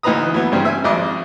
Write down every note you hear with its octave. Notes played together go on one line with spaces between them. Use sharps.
D2 E3 D#4 B4 A#5 D#6
E3 F#3 B3
G2 C#3 G3 C4
E5 G#5
G#1 F2 D5 D#5